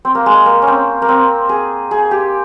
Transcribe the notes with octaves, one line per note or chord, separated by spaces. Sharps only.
C4
A#3
G#3
A#3
C#4
C4
A#3
C4
G#4
G#4
G4